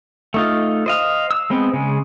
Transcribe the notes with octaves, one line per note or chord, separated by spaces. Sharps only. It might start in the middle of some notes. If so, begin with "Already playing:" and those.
A3 D#4 F4
C5 D#5 F5
E6
G#3 B3 C4
C#3 G#3